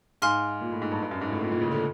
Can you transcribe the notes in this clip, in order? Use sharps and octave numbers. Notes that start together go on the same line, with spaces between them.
G#2 F5 G#5 C6 F6
A#2
A2
G#2
G2
G2
F#2
G#2
A2
A#2
A#2
C#3
D3